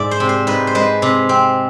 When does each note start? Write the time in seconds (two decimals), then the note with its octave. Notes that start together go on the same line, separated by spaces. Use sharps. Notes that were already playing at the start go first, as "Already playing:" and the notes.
Already playing: G#2 D5 E5
0.11 C5
0.20 C3
0.29 C5
0.47 G#2 B4
0.67 C5
0.75 G#3 B4
1.02 C3
1.29 C4